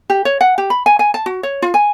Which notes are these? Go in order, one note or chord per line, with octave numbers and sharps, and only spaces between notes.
G4
C#5
F#5
G4
B5
G#5
G#5
A5
F#4
C#5
F4
G#5